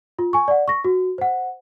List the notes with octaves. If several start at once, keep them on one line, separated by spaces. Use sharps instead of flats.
F4
G#5 C#6
D5 F#5
C#6 A#6
F#4
C5 F#5